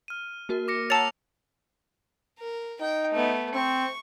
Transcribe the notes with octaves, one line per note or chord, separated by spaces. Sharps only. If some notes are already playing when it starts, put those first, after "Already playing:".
F6 D#7
A#3 F#4 A#4
D6 A#6 C#7
C#5 F#5 A5 A#5 E6 A6 C#7 F7
A#4
D#4 G5
A3 B3
C4 C#6